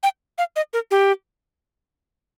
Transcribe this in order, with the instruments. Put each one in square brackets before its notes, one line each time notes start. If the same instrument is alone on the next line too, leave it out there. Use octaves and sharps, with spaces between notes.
[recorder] G5
F5
D#5
A#4
G4